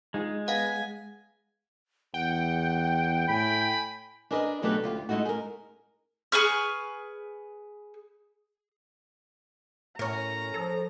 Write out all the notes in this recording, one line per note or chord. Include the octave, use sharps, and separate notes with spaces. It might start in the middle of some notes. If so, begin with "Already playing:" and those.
G#3 D#4 F4 G#4
B3 F5 F#5 G#5
E2 F#5 G5
A2 G#5 B5
D4 G#4 A#4 B4 D#5
B2 F#3 A3 D4 G4 B4
D2 F4 G4
G#3 A3 D#4 E4 F#4
G#4 A#4
G#4 B4 C#6 F6
A2 C#4 A#4 A#5
F3 A4